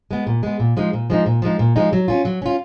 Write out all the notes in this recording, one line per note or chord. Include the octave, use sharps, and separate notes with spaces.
G#3 B3
A#2
G#3 B3
A#2
F3 G#3 D#4
A#2
F3 G#3 D#4
A#2
F3 G#3 D#4
A#2
F3 G#3 D#4
F#3
C#4 F4
F#3
C#4 F4